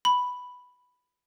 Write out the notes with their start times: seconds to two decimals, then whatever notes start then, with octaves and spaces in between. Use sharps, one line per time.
0.05 B5